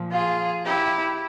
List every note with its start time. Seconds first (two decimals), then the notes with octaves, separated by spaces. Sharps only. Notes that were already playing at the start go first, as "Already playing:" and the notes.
Already playing: A#2 F3
0.12 F4 G#4
0.65 E4 G4